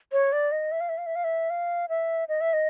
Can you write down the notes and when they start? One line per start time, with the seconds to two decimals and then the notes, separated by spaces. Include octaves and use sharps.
0.12 C#5
0.33 D5
0.52 D#5
0.72 E5
0.81 F5
0.89 E5
0.98 F5
1.06 E5
1.16 F5
1.24 E5
1.50 F5
1.89 E5
2.29 D#5
2.41 E5
2.53 D#5